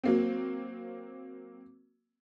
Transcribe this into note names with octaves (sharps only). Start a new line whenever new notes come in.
F#3 A#3 C4